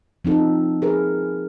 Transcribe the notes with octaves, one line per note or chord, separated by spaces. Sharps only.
F3 C4 D#4 A4
G#4 A#4 B4